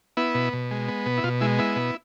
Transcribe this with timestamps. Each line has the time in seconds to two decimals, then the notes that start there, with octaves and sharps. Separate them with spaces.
0.17 B3 E4
0.35 B2
0.53 B2
0.71 G#3
0.88 B3
1.06 B2
1.17 E4
1.24 B2 F4
1.41 G#3 E4
1.59 B3 E4
1.76 B2